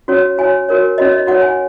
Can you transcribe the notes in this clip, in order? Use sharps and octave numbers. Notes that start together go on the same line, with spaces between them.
C#4 F#4 C#5
F#4 C#5 G#5
F#4 A#4 C#5
C#4 F#4 C#5 D#5
D#5
F#4 C#5 F#5
G#5